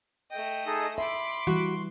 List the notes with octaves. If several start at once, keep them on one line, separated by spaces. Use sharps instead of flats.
A3 D#5 G5
D#4 G#4 A4
E5 B5 C6 D6
E3 G3 F#4